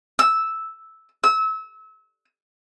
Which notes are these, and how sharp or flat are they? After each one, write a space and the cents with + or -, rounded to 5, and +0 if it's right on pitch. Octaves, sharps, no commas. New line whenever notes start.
E6 -5
E6 -30